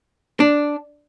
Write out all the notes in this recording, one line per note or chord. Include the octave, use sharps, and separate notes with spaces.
D4